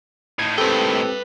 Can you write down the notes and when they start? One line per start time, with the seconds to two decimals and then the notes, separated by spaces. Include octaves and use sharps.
0.39 A2 D#3 G#6
0.58 C4 G4 A4 B4 G5